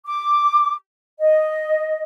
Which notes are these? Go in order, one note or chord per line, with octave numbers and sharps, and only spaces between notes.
D6
D#5